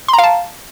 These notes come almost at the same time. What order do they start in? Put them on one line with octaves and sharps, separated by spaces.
C6 A#5 F5 A5